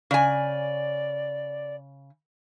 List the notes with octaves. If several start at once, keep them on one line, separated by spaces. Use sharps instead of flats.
C#3 D5 G#5